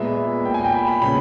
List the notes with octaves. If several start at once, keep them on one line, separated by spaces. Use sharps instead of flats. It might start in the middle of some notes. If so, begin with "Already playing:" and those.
Already playing: A#2 G#3 B3 E5
A#2 A#3 G5
G#5
G5
B5
B5
C#3 G#3 B3 B5